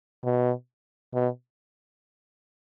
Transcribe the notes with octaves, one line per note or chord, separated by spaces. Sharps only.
B2
B2